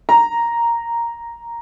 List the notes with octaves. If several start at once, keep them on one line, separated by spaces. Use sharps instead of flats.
A#5